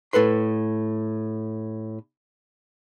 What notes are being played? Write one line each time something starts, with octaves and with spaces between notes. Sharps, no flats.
A2 A4 B4 C6